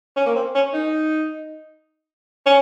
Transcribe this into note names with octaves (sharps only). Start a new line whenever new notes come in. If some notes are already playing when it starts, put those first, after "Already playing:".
C#4
A#3
C4
C#4
D#4
C#4